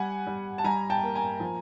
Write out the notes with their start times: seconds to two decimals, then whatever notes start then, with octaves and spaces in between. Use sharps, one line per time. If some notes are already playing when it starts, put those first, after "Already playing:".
Already playing: G3 F#5 G#5
0.27 G3
0.58 A5
0.64 G3 G#5 A#5
0.90 G5 A5
1.03 A#3
1.15 G#5 A#5
1.40 F3